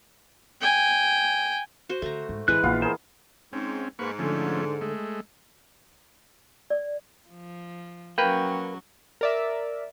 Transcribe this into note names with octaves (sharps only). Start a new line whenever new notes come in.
G5 G#5
F#4 C5
D3 A3 A#5
G#2
G#1 E3 G#3 B4 F#6
A#1 B3 F4 F5
G#4 A#4 C5
G#2 C4 C#4
G#2 A#3 B4 C#6
D3 F3 A3 C#4
G#3 A3
D5
F3
F#3 A#3 C#4 B4 G5
A#4 D5 E5